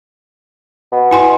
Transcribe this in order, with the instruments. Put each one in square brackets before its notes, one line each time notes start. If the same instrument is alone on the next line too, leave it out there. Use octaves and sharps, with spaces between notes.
[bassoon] B2
[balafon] E4 G#5 C6